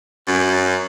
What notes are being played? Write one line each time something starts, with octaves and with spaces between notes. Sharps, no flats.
F#2